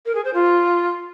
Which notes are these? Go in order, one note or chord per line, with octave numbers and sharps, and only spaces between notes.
A#4
G#4
C5
F4